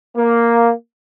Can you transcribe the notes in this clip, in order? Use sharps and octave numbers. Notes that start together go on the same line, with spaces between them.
A#3